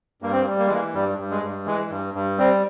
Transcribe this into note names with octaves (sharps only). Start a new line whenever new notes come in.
G2 A#3
C4
A#3
G3
A#3
G#3
E3 A#3
G2 G3
G2
G#3
G2
E3 G#3
G2
G2
G3 C4